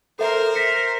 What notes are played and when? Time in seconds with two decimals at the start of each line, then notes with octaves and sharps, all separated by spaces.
0.19 A4 A#4 C5 E5
0.55 A#6 B6 C#7